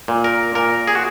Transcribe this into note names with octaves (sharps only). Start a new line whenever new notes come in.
A#2
A#4
A#2 A#4
G#4
F#4